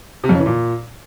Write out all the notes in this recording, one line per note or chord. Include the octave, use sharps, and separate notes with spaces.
C3
F2
C#3
E3
A#2